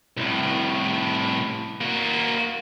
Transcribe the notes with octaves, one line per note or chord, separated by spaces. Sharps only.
C2 A2
A#3 F#4